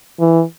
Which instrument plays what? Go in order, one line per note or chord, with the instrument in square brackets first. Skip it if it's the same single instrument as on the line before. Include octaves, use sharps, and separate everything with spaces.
[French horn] E3